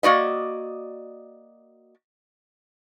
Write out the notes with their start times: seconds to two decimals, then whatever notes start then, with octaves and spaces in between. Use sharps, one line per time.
0.03 A#3 F#4 D5 D#5